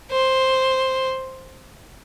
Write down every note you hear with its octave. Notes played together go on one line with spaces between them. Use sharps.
C5